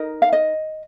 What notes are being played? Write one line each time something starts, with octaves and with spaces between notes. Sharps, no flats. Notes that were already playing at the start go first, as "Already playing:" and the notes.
Already playing: D#4 A#4 D#5
F5
D#5